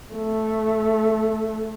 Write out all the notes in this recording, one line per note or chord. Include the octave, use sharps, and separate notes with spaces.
A3